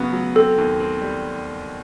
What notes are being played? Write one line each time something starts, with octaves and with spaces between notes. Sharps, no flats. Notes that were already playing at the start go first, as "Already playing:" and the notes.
Already playing: C#3 F#3 B3
F#3
C4 A4
D#2
C4
G3